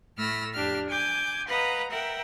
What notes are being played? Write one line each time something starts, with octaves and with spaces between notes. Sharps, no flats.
A2 A3 B5 E6 F6 A#6
F2 D4 G4 F6
G#5 D6 G6 G#6
B4 D#5 F5 F#5 A#5
A#4 E5 F#5 G5